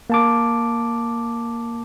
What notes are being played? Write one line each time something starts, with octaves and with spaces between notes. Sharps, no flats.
A#3 A5 D6